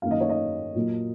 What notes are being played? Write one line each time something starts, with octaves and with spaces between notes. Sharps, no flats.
F#2 D#3 A#3 F5
D#5
C#5
D#5
A#2 F#3 A#3